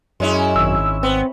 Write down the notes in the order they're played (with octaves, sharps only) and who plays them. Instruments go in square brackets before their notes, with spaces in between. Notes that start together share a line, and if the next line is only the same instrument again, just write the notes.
[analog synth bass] F#2 [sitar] G#3 C#4 E4
[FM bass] G#1 [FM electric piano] E6
[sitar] B3 [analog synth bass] C4